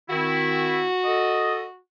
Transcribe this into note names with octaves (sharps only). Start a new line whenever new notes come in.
D#3 C4 E4 F#4
A4 D#5